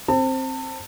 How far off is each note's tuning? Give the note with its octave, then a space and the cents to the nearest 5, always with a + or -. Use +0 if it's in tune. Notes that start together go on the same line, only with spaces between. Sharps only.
C4 +10 A5 +35